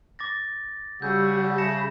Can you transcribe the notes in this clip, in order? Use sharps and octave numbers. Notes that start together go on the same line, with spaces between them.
D6 A6 A#6
C#3 G3 F#4 F#5 E6 G6
E5 A5 B5 A#6 C#7 E7